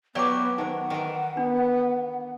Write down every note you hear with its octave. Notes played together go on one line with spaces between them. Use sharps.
E3 F#3 B3 G4 D5 D6
D#3 D#4 C5 F#5
D#3 E3
B3 D4